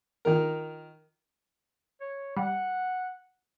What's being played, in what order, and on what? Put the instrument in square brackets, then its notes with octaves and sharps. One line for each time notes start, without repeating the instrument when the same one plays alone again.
[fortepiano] D#3 F3 A#4
[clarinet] C#5
[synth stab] G3 [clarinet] F#5